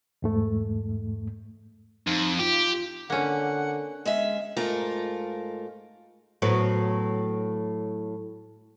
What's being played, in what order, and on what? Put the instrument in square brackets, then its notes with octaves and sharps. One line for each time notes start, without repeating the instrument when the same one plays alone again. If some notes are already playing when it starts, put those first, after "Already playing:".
[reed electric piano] E2 G#2 A3
[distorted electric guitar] F2 [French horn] D#4
[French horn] F4 [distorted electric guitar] G4
[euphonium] D3 [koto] A#3 C#4 [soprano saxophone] F#5
[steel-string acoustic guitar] G#3 C#4 E5
G#2 A3 F4 A#4
[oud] A2 F#3 B3